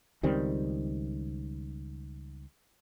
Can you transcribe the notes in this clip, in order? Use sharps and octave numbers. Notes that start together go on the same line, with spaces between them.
C#2 D#3 G3 C4